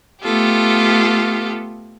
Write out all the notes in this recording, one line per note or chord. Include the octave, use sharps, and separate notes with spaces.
A3 B3 F4 G4 A4